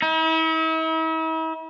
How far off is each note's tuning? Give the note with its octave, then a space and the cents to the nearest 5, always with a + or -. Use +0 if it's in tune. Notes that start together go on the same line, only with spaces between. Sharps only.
E4 -45